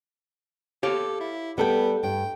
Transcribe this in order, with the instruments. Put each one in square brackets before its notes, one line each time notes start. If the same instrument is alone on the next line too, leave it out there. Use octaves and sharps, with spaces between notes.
[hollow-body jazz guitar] G4 C#5 F5 [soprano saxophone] A4
[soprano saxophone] E4
[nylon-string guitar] G3 A4 G5 [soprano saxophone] B3
[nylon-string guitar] G2 [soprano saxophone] G5